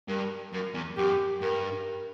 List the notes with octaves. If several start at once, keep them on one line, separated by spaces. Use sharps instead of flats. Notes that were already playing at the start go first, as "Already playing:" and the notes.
G2 A#4
F#2 A#4
E2
F#2 G4
G2 A#4